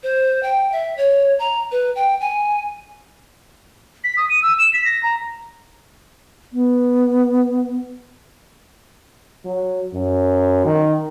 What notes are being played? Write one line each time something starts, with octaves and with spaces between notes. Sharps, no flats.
C5
G5
E5
C#5
A#5
B4
G5
G#5
B6
D#6
D#7
E6
E7
B6
A#6
A#5
B3
F#3
F#2
D#3